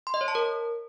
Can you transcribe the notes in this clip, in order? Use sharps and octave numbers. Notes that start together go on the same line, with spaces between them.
C6
D#5
C#5
A5
A#4